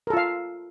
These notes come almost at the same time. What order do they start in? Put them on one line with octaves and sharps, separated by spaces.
A#4 A4 F4 F5